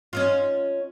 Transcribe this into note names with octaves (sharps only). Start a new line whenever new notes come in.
C#4 D#4 F4